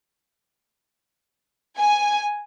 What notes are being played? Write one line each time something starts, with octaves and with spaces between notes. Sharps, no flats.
G#5